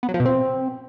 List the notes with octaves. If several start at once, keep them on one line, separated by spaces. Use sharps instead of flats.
B3
F#3
F3
B2
C4